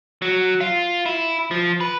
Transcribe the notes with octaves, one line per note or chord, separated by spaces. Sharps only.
F#3
F4
E4
F3
B4